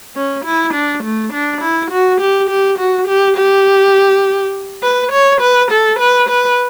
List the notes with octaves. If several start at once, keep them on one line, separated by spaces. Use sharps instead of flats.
C#4
E4
D4
A3
D4
E4
F#4
G4
G4
F#4
G4
G4
B4
C#5
B4
A4
B4
B4